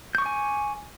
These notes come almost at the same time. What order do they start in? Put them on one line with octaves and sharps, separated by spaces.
G6 C#6 D6 G#5